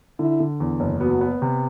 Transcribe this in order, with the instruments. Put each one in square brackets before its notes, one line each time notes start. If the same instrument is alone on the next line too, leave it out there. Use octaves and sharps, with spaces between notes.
[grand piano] D3 [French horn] E4
[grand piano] D3
E2
F#1
[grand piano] B3 [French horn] F#4
[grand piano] B3
C3